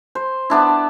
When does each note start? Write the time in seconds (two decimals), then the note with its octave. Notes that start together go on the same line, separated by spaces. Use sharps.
0.15 C5
0.50 B3 D4 E4